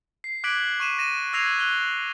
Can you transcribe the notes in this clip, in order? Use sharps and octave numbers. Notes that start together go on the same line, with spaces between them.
C7
D6 F#6 G#6 B6 D7 F#7
C#6 D#7 E7
A#6 D#7 E7
E6 F#6 G#6 A#6 C7 F7
F#6 G7